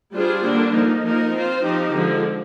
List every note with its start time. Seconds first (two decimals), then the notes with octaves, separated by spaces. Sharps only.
0.13 G3 D4 F4 G#4 C5
0.43 D3 G3 A#3 D4
0.73 F3 A#3 D#4
1.02 F3 A#3 D#4 A#4
1.33 C4 F4 C5
1.63 F3 C4 D#4 G4
1.93 D3 F3 G#3